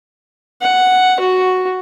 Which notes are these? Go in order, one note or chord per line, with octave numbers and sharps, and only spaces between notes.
F#5
F#4